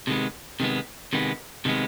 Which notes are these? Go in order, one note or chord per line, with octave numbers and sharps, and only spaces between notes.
C3 D#3 G#3 B3
C3 D#3 G#3 B3
C3 D#3 G#3 B3
C3 D#3 G#3 B3